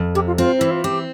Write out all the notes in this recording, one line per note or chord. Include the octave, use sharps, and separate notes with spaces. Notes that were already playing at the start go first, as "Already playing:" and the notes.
Already playing: F2
C3 G4
F4
C4 F4
E3 E4
F4
C4 G4